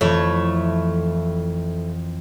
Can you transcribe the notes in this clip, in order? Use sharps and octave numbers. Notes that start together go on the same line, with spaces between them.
F2 E3 A3 E4 C#5